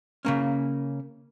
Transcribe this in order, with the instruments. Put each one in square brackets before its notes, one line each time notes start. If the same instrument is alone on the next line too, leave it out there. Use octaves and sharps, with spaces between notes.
[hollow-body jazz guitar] C#3 A#3 C#4